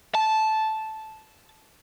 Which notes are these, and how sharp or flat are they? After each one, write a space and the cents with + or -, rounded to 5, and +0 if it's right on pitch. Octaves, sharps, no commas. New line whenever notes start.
A5 -10